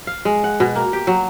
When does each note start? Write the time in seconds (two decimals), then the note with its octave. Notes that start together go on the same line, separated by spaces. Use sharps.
0.07 F5
0.25 G#3
0.44 F#5
0.60 B2
0.76 A#3
0.93 G4
1.07 F#3